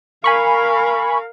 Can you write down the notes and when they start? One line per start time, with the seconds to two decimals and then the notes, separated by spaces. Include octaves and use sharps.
0.24 A#4 F5 G#5 B5 C#6